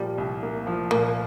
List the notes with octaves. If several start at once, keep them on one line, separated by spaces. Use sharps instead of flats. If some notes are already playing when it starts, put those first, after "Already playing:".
Already playing: A#2 F3 G3 A#3
C2
A#3
F3
A#2 A#3